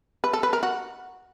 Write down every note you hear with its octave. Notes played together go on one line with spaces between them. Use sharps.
B4
A4
B4
A#4
F#4